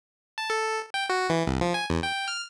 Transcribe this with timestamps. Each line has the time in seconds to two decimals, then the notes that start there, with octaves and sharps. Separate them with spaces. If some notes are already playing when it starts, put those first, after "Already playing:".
0.38 A5
0.50 A4
0.94 G5
1.10 F#4
1.29 E3
1.47 C2
1.61 F3
1.74 G#5
1.90 E2
2.03 G5
2.28 F6